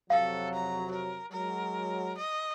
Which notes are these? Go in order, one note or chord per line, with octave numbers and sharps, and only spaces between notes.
F2 C3 F#3 A4 F5
A#5
A#4
F#3 G#3 A#4
D#5